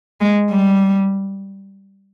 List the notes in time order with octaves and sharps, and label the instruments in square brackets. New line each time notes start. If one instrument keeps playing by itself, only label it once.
[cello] G#3
G3